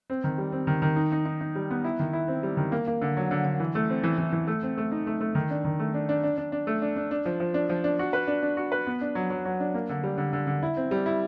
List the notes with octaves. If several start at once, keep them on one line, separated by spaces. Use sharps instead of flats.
C4
D#3
G3
C4
D#3
D#3
D#4
D#4
D#4
D#4
G3
B3
E4
D#3
E4
C4
G3
D#3
A#3
A#3
D3
F#3
D3
D3
E3
A3
C4
E3
E3
E3
A3
C4
A3
D#4
A3
A3
D#3
D4
D#3
A3
D4
D4
D4
D4
D4
A3
D4
D4
D4
F3
F3
D4
F3
D4
F#4
B4
D4
D4
F#4
B4
B3
D4
F#3
F#3
F#3
D4
A#3
D3
G3
D3
D3
D3
E4
C4
G3
E4